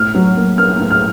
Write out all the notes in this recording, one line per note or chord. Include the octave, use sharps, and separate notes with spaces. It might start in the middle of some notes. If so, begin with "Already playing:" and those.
Already playing: A2 F6
F#3
A#3
A#3 F6
A2
F6